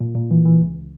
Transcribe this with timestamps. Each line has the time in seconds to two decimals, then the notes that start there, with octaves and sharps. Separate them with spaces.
0.01 A#2
0.16 A#2
0.31 E3
0.45 E3
0.61 C#2